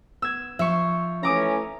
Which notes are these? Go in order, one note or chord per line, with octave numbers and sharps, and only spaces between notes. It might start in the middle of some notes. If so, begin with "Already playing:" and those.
B3 E6 G#6
F3 E5 C#6
E3 A3 C#4 A#5 D6 D#6